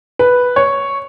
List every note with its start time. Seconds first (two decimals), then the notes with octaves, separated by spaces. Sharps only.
0.19 B4
0.56 C#5